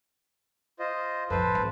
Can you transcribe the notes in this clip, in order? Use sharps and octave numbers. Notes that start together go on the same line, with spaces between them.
F4 C5 D#5
A1 F2 A4 B4 C5
G#1